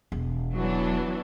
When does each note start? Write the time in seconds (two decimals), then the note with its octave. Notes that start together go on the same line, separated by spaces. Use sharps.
0.12 E1
0.54 E3 F#3 B3 D4 F#4